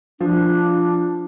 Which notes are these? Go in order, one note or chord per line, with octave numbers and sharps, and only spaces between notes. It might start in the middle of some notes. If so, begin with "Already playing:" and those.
F3 D4